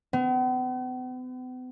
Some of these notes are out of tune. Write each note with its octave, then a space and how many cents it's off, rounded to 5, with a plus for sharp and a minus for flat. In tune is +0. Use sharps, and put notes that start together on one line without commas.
B3 +45